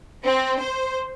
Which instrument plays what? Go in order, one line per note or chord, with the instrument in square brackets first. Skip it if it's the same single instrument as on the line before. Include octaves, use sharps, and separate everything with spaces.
[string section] C4
C5